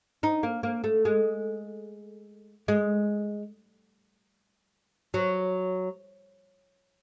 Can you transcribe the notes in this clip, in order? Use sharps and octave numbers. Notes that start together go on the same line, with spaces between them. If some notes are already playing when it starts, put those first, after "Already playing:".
D#4
A#3
A#3
A3
G#3
G#3
F#3